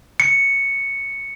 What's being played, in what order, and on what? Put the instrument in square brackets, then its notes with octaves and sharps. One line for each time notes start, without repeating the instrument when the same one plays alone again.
[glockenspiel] C#7